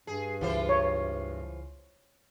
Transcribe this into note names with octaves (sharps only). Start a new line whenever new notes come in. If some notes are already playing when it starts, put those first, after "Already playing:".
G2 G#4
C#2 E3 F4 C5
C#5